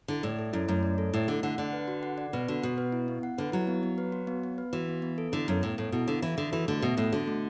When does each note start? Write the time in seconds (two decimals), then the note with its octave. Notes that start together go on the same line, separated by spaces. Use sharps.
0.08 D3 E4
0.23 A2 D5
0.39 A4
0.53 F#2 E4
0.68 F#2 A3
0.83 D5
0.98 A4
1.13 A2 E4
1.28 D3 A3
1.43 D3 F#5
1.58 D3 D5
1.73 B4
1.88 F#4
2.03 F#5
2.18 D5
2.33 B2 B4
2.48 D3 F#4
2.63 B2 F#5
2.78 B4
2.92 E4
3.08 B3
3.23 F#5
3.38 D3 B4
3.52 F#3 E4
3.67 B3
3.83 B3
3.98 B4
4.12 F#4
4.27 B3
4.43 B3
4.58 B4
4.73 E3 F#4
4.88 B3
5.02 B3
5.18 A4
5.32 D3 E4
5.48 F#2 B3
5.62 A2 B3
5.78 A2 A4
5.92 B2 E4
6.07 D3 B3
6.22 E3 E5
6.37 D3 A4
6.52 E3 F#4
6.68 D3 A3
6.82 B2 E5
6.97 A2 A4
7.12 D3 F#4
7.28 A3